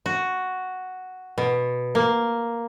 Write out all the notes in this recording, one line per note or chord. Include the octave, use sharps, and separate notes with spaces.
F#4
B2
A#3